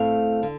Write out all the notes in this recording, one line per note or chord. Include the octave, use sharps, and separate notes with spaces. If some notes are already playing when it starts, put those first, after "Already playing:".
Already playing: A2 A3 C4 F5
D3